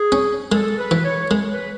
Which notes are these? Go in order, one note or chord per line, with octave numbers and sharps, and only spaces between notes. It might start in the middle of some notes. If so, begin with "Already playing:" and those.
Already playing: G#4
C#4
G#3 A4
B4
E3
C#5
G#3
B4